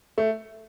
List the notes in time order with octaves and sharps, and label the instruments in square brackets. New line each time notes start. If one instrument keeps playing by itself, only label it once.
[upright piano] A3